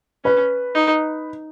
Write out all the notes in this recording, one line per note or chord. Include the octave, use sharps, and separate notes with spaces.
C#4 B4
D#4